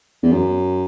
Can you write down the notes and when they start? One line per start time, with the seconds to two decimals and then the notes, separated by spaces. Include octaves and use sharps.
0.22 E2
0.31 F#2